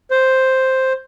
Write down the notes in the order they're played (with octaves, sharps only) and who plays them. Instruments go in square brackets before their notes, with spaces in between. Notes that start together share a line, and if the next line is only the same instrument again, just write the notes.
[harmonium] C5